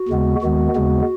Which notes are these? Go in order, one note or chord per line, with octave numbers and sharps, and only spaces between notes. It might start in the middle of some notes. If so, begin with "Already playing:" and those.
Already playing: F#4
D#2 C#3 G#3 B3
D#2 D#3 G#3 B3 F#4
D#2 C#3 G#3 B3